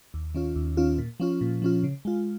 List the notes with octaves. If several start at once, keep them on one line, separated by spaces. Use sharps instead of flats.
D#2
D#3 C#4 F4
D#2
D#3 C#4 F4
A#2
F3 C#4 F4
A#2
F3 C#4 F4
C#3
G#3 F4